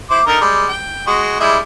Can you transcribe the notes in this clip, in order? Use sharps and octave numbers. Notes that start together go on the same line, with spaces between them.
E4 C5 D6
D3 D#4 A#4
G3 G#3
G5
G#3 F#4
G3 G#3 E4